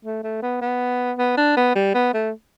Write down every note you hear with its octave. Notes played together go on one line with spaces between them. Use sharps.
A3
A3
B3
B3
B3
D4
B3
G3
B3
A3